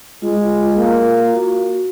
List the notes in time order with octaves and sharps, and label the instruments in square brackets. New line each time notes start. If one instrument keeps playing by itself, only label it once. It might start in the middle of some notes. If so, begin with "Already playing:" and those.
[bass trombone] G#3 [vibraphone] F4
[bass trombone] A#3
[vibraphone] F#4